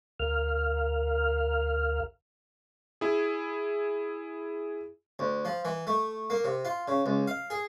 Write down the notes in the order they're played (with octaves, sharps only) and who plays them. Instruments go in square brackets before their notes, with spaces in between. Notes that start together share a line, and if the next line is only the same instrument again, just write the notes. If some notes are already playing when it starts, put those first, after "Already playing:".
[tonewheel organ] D2 A#4 F5 F6
[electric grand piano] E4 G#4
[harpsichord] D2
F3
E3
A3
A#3
C3
F4
C#3
C#2
F5
G#4